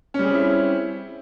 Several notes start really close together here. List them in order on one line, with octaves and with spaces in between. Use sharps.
C#4 G3 G#4 C4 E4